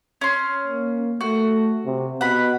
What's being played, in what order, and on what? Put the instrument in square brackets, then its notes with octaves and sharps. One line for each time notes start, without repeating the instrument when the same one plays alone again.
[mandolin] C#4 C6
[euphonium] A#3
[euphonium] A3 [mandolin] F#4
[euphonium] C3
[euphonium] B2 [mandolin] F#5 B5